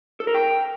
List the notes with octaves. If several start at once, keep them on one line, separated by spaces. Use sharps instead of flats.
A4
A#4
G5